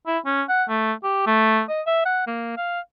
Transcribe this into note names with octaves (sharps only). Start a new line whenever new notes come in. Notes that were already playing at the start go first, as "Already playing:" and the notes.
E4
C#4
F#5
A3
G4
A3
D#5
E5
F#5
A#3
F5